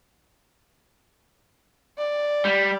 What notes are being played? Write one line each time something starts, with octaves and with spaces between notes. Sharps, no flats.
D5
G3